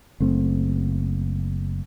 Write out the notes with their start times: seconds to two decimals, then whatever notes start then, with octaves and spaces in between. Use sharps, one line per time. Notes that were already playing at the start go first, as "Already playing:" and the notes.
0.20 F#1 A3 C4